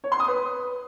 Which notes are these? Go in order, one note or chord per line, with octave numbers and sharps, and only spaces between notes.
C#5
C6
D#6
B4